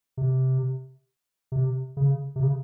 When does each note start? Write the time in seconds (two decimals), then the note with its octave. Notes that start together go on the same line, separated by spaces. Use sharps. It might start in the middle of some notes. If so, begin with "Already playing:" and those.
0.17 C3
1.52 C3
1.97 C#3
2.36 C3
2.43 C#3